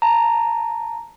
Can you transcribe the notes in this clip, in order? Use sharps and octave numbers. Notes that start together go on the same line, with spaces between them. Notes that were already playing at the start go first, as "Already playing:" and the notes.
A5 A#5